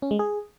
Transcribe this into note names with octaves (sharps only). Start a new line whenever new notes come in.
C#4
G#3
G#4